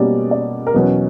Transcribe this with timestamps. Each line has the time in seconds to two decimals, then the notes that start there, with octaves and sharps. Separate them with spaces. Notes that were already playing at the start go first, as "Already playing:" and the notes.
Already playing: B2 G3 A#3 C#4 D5
0.31 D5
0.67 A#4
0.74 E2 B2 F#3 C#4 B4